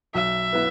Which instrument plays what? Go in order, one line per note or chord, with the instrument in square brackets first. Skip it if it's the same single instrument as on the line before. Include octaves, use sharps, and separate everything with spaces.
[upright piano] B1 [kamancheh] E5
[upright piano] B3 E4 B4